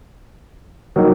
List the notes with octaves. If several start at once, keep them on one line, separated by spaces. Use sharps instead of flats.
D#3 F#3 A#3 D#4